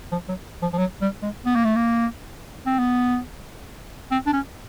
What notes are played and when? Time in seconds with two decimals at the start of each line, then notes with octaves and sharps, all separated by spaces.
0.12 F3
0.29 F#3
0.62 F3
0.73 F3
0.78 F#3
1.01 G3
1.22 G#3
1.46 B3
1.56 A#3
1.65 A3
1.76 A#3
2.66 C4
2.79 B3
4.11 C4
4.27 D4
4.33 C#4